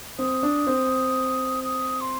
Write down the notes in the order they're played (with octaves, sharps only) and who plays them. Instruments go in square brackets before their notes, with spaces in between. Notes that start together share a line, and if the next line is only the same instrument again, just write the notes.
[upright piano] C4 [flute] D#6
[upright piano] D4
C4
[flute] D#6
C6